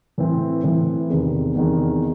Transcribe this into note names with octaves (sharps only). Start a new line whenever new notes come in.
A2 E3 C4
A2 E3 C4
E2 C3 D#3
E2 C3 D#3